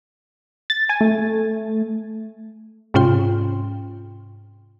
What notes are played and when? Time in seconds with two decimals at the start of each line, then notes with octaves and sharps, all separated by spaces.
0.70 A6
0.89 G#5
1.01 A3
2.94 G#2 C3 C#4 F4 G5 C6